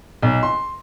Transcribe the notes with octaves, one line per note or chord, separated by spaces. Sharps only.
B1
C6